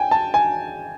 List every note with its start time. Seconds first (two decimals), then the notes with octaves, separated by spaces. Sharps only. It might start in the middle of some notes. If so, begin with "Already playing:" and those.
Already playing: G5 G#5
0.11 A5
0.34 G#5